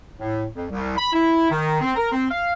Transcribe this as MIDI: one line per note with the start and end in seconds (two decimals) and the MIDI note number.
0.20 0.44 45
0.55 0.65 41
0.70 0.96 36
0.97 1.07 83
1.13 1.50 64
1.51 1.80 51
1.81 1.93 60
1.96 2.11 70
2.12 2.25 60
2.30 2.52 77